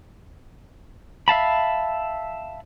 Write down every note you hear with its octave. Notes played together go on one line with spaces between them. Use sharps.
E5 F5 A5 B5